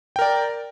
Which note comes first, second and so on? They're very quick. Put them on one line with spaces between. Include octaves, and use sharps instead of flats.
G5 A#4 D5